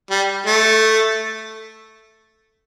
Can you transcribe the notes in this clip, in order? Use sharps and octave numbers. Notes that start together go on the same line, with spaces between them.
G3
A3